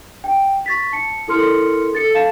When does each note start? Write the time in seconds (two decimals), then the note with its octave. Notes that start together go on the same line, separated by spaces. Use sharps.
0.24 G5
0.66 C#6 A6 B6
0.92 A5 C#7
1.28 E4 A4 A#4 C6 F6 C#7
1.93 A4 A6 C#7
2.15 F5 A5 A6 E7